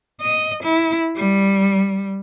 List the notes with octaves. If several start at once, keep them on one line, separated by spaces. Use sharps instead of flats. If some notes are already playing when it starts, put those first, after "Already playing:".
D#5
E4
G3